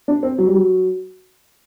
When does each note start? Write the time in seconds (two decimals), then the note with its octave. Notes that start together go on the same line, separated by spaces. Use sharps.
0.08 D4
0.23 C4
0.38 F#3
0.46 G3
0.54 F#3